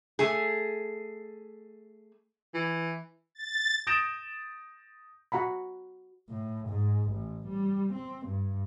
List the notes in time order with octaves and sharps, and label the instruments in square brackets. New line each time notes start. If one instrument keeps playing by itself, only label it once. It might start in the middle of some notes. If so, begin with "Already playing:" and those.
[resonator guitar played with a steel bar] A3 G#4
[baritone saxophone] E3
[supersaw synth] A6
[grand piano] D#6 G6 A6 A#6 D7 E7
[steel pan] F#4 F#5 A#5 B5
[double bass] A2
G#2
A1
G3
C4
G2